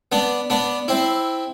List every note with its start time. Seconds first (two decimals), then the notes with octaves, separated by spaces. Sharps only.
0.12 B3 D4
0.50 B3 D4
0.88 C4 E4